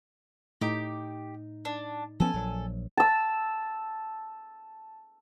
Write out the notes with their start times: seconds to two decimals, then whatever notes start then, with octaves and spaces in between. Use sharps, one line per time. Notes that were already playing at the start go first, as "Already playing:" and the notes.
0.61 A2 D#4 G4 D6
1.65 D4
2.20 F3 B3 C#4 A4 G#5
2.34 A#1 F#3
2.97 A5 E6